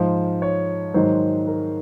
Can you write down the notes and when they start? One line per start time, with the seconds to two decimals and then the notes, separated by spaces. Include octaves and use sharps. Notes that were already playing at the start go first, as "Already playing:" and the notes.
Already playing: G#2 F3 C5
0.42 C#5
0.94 G#2 D#3 F#3 C5
1.47 A#4